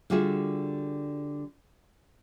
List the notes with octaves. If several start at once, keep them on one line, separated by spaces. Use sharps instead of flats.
D3 G3 F4 F#4 G#4 E5